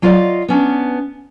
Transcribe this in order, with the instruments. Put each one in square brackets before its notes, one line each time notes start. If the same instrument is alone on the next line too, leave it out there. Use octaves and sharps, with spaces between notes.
[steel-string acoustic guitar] F#3 F4 D5 D#5 F5
B3 C#4 D4